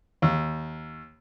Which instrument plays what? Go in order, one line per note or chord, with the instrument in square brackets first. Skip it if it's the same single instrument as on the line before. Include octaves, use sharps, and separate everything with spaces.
[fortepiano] D#2